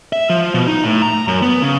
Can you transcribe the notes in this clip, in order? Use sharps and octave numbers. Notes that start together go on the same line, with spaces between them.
E5
F3
B2
D#4
A2
A#5
F#2
B3
C#3